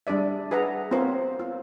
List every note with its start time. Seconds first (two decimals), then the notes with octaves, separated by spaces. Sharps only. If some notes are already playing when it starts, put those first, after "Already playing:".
0.07 G3 D4 G#4 D5 E5
0.51 G#4 B4 E5 F#5 A#5
0.91 B3 C4 F4 A#4 C5 C#5
1.39 F4